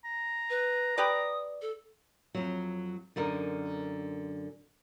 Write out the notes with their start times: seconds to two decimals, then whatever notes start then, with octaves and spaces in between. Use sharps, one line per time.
0.04 A#5
0.50 B4
0.97 G4 B4 D5 D#6
1.62 A4
2.35 F2 F#3
3.16 F#2 D3 D#4 A#4